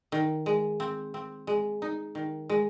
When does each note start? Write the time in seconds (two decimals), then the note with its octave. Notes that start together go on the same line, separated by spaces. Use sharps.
0.12 D#3
0.46 G#3
0.80 C4
1.14 C4
1.47 G#3
1.82 D#4
2.15 D#3
2.49 G#3